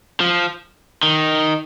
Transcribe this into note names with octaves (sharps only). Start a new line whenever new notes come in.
F3
D#3